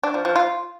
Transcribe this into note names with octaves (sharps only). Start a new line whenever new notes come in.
D4
F3
F3
F4